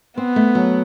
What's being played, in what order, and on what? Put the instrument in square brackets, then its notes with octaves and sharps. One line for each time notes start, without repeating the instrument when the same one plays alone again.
[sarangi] B3 [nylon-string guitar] C4
[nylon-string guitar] A3
F#3